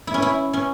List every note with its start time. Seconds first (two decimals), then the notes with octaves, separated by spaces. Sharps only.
0.07 E4
0.14 C#4
0.22 E4
0.53 C#4